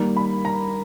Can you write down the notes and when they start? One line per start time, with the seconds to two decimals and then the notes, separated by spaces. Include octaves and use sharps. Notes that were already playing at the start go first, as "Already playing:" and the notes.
Already playing: D#3 G3 A#3
0.17 B5
0.45 A#5